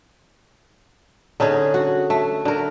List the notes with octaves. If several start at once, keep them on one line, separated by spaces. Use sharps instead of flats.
D3 C#4 D#4 G#4
F#4
A3
D3 A#4